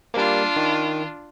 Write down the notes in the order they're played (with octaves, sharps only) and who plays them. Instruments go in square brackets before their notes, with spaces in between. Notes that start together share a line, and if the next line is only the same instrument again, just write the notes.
[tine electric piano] G3 A#3 [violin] D4 F4
[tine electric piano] D#3